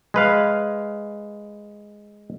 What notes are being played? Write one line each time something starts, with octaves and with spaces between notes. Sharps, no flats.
G#3 B4 F5